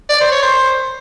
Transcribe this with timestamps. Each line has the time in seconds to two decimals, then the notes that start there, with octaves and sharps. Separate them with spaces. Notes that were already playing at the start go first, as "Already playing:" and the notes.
0.09 D5
0.20 C5
0.32 C#5
0.43 C5